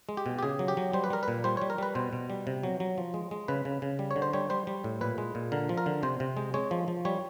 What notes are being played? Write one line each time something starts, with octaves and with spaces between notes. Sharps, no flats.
G#3
G4
B2
G4
C#3 G#4
F#3
G4
F#3
G3 C5
B4
G3 A#4
B4
A#2
G3 C5
G3 C#5
A#4
G3 B4
B2 C5
B2
G3
C3
F#3
F#3
F3
G#3
G#3
C#3 B4
C#3
C#3
G3
C#5
D3
C5
G3 C#5
G3 C5
G3
A2
A#2 B4
G#3
A#2
D3 A#4
F3
A#4
D3
C3 C5
C3
G#3
G#3 C#5
F3
F3
G3 C#5